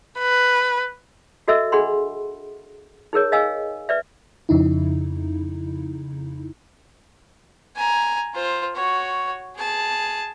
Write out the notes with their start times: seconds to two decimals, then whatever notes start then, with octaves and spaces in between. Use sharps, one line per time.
0.19 B4
1.48 F#4 A4 D#5 E5 E6
1.72 D4 G#4 F#5 B5 C6
3.13 D#4 G#4 A#4 C#5
3.32 D#5 F5 G#5 E6
3.89 B4 D5 E5
4.49 F2 C#3 D#4 E4
7.76 G#5 A#5
8.35 F4 C5
8.76 F#4 C#5
9.57 G#4 A5